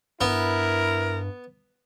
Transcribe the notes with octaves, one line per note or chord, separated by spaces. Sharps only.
G2 B3 E4 A#4